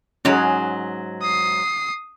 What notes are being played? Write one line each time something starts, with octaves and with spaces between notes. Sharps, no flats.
G#2 F#3 C#4 G#4
D#6 C7